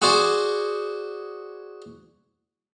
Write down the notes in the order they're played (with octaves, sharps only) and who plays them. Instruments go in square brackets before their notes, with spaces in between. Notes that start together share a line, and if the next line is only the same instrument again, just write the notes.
[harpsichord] F#4 G#4 C5 D5 G#5